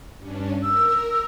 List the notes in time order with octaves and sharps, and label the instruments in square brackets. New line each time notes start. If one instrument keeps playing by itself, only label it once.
[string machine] G2 C#4 D4
[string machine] A#4 [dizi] E6